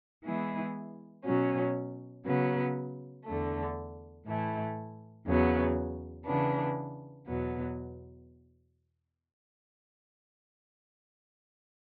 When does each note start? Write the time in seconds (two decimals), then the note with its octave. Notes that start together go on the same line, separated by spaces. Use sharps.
0.23 E3 G#3 B3 E4 G#4
1.25 B2 F#3 C#4
2.24 C#3 F#3 B3
3.24 E2 D3 A3
4.25 A2 E3 A3 E4
5.26 E2 C#3 F#3 B3
6.25 C#3 E3 B3 D4
7.26 E2 B2 F#3 B3